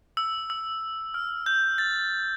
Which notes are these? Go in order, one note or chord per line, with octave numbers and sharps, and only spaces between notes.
E6
E6
F6
G6
A6